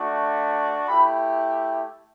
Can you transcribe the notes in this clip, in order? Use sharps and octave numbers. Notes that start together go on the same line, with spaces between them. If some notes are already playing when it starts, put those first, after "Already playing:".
Already playing: A3 D4 F#4
A3 E4 G4 B5